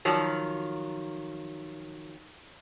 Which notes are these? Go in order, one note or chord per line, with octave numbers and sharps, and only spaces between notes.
D#3 F3 F#3